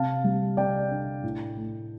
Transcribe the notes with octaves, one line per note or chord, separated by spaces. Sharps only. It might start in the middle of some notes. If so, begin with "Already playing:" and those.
Already playing: C3 F5 A5
G3
C3 D5 G5
D4
A2
A3